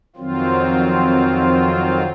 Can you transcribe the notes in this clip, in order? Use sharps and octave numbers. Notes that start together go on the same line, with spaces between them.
F2 D#3 F#3 C4 F4